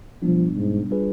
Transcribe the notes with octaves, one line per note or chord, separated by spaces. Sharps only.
B2 F3 G3 B3 D4
G#2
G3 D4 F4 G#4 B4